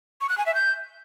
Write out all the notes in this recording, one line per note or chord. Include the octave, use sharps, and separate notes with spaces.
C#6
F#6
G#5
E5
G6